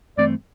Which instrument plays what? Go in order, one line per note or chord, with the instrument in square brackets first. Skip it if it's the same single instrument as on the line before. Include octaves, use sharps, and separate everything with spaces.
[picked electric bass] G2 E3 A3 C4 [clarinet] D5